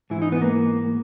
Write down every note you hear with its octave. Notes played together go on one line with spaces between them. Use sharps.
G#2 E3 E4
D#4
B3
A#3